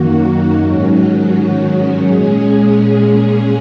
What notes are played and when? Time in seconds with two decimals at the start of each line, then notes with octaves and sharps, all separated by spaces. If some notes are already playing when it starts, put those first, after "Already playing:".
Already playing: F#2 D#3 A#3 F#4
0.64 G#2 D#3 F#3 C#4 F#4
2.06 A#2 G#3 C#4 G#4